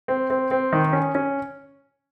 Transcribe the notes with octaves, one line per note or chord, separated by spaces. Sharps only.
C4
C4
C4
D#3
C#4
C#4